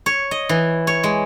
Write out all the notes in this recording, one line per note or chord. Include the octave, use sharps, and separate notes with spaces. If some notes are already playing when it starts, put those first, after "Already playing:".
C#5
D#5
E3
C#5
G#3